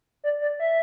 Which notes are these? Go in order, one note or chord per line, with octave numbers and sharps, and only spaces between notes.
D5
D5
E5